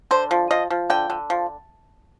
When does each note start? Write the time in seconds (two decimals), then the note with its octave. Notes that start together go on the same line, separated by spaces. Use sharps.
0.11 D3 C5
0.31 F3
0.51 F3 D#5
0.70 F3
0.90 D3 G5
1.10 D3
1.30 F3